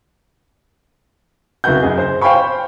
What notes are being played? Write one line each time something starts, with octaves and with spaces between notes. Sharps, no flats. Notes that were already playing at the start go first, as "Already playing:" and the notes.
C2 C#3 F#4 B4 F#5 G6
F#2 G#4 D#5
C5
C5 F5 G5 G#5 B5 C#6
C5